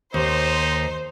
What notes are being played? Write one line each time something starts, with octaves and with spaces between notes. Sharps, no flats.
D#2 D#4 C5